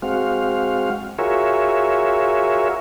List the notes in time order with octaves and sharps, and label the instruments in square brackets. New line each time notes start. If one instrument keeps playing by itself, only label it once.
[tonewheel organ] G#3 C4 F#4 F5
F4 F#4 G#4 A#4 C#5 E5